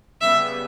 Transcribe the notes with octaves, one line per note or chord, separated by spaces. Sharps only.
C#3 G3 B3 E5